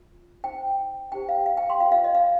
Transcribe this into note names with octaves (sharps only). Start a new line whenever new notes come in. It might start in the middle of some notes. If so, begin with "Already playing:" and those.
Already playing: F4
D#4 C5 G5
D#4 G4 C5 G5
F5
F5
G5
C6
F4 C5 F5
F5
D#5
F5